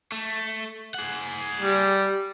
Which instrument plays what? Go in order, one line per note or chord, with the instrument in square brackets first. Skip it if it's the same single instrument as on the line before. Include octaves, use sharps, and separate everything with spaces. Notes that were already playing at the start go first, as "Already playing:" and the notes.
[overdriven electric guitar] A3
G#4 F#5
[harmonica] G3